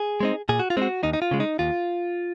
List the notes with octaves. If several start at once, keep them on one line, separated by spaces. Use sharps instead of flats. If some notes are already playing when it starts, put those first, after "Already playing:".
Already playing: G#4
G#3 C4 D#4
A#2 G#4
F#4
F4
G#3 C4 D#4
F#4
D#2 D#4
D#4
F4
C#3 G#3
D#4
D#2 F4